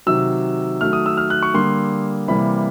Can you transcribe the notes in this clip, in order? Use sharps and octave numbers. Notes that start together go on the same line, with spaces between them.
C3 D#3 F#3 E6
D#3 F#3 A3 F6
D#6
E6
F6
F#6
C#6
D3 G3 A#3 C6
C3 E3 G3 A#3 B5